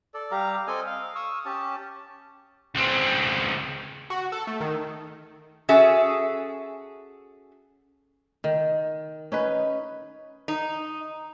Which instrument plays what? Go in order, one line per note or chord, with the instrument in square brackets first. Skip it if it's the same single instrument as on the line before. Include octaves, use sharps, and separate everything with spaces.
[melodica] A4 D5
G3 G4 F5 A#5
C4 A4 D#5 G#5
F5
C#6 D#6 E6
C#4 G4 A5
[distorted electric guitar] C#2 C4
[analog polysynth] F#4
A4
A3
D#3
[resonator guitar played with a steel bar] C#4 F#4 G#4 A4 E5
[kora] D#3
C#4 D#4 B4
[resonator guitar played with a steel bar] D#4